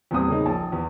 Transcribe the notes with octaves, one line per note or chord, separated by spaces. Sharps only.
E2 A#2 G3 C4 D#6
C#3 A#3 D#4
A#1 A5
E2